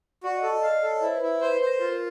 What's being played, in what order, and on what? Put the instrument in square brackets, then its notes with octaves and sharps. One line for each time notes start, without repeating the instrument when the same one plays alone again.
[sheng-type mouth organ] F#4 [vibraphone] D5
[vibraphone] D#5
[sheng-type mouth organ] A4
[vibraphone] D#5
[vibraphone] D#5 [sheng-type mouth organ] F5
[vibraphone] D5
[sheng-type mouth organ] A4
[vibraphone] C#5
[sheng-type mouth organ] E4 [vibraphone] C5
[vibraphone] B4
[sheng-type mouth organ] E4
[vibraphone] B4 [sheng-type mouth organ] C5
[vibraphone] B4
[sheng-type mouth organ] C5
[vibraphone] A#4
[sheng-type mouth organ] F4 [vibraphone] A#4